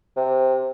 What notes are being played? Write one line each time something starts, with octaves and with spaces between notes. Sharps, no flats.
C3